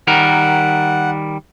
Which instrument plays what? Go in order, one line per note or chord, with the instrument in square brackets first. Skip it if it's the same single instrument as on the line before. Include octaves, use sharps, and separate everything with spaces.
[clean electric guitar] D#3 G3 A#4 [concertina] F#5